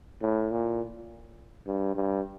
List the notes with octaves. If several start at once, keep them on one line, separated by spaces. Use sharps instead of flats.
A2
A#2
G2
G2